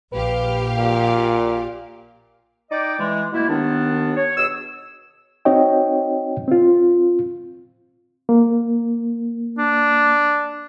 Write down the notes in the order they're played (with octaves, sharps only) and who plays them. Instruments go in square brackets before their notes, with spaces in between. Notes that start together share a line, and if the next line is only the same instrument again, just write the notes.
[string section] A#1 G4 F5 [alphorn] B4
[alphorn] A#2
[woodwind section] D#4 D5 D#5 G5 D6
E3 G#3
B2 A3 A#3 E4
D#2 D#3 B3 D4
C#5
B2 G#4 E6
[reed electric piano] C4 D#4 F#4 C#5 D#5 G5
C4 F4
A#3
[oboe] D4